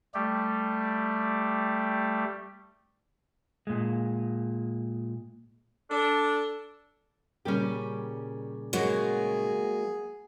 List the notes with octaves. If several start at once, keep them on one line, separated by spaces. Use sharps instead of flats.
G3 A3 G4
A#2 G#3
D4 A4
A#2 C#3 G3 C#4 G4
F#3 G#3 A#3 B3 F#4 G#4 C#5